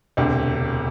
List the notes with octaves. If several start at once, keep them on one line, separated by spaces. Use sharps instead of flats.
E1 D2 C3